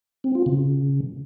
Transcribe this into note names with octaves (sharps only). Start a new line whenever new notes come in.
C4
F4
C#3